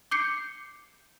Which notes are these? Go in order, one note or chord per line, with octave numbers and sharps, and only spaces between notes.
D6 G6 C7 C#7